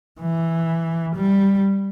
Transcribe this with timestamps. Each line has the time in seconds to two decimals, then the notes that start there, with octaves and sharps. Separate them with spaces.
0.20 E3
1.16 G3